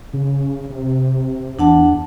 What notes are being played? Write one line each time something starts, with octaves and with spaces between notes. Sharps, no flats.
C#3
C3
E2 D4 F#5 A5